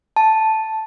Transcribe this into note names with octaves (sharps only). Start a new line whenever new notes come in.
A5